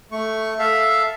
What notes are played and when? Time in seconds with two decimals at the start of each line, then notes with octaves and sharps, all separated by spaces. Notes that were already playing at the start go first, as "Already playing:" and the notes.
0.12 A3 C#6
0.59 A4 E5 F5